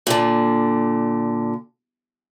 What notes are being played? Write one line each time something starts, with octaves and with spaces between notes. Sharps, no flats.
A#2 D3